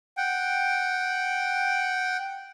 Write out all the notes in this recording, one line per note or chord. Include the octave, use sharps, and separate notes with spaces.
F#5 G5